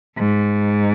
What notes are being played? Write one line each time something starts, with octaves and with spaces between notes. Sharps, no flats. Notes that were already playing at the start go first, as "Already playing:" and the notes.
G#2